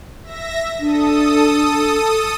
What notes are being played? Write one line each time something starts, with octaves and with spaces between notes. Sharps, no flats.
E5 A#6
D4 A4 D#6